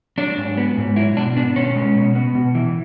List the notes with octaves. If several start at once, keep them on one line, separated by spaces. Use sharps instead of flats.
F#3 D4
G#2
B3
G#2
F#3 E4
B2 D4
B3 D4
B2 C#4
G#3
B2
B3
B2
E3